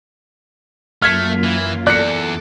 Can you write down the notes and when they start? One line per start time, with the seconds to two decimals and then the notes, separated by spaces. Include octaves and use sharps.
1.02 F#2 A3 A#3 F4 F6 G#6 B6
1.44 E3
1.87 E2 A4 D5 A5 D6 F#6 C#7